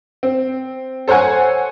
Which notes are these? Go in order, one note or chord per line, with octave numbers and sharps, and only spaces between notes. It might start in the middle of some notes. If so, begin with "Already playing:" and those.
C4
A4 C5 C#5 F#5 G#5